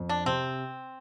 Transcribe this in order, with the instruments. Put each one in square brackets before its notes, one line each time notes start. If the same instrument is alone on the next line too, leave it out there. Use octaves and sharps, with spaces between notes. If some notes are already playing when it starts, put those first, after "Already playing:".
Already playing: [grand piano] F2
[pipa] D4
[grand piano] C3 [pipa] C4